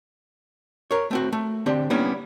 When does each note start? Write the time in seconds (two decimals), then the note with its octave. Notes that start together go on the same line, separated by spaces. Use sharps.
0.91 A#4 C#5
1.11 A3 C4 F#4
1.33 A3
1.66 D3 C4 D4 G4
1.90 G3 A#3 B3 C#4 D4 E4